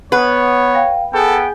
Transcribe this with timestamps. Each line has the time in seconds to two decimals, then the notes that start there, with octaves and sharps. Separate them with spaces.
0.12 B3 B4 C#5 F#5
0.75 F5 G5
1.14 B3 G#4 A4 G5 G#5